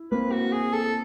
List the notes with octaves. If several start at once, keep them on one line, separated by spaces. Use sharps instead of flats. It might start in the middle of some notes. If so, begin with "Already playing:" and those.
Already playing: E4
A#3 C4 B4
F#4
G#4
A4